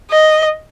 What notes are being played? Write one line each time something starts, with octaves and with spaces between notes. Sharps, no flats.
D#5